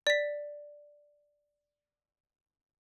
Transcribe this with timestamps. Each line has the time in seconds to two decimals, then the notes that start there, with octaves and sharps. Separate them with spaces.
0.07 D5 B6